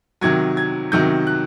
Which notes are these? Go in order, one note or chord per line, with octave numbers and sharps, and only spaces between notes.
C3 D#3 F#3 G#6
G#6
C3 D#3 F#3 G6
F#6